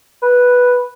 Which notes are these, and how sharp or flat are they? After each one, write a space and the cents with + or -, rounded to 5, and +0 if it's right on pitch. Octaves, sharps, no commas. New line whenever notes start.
B4 -5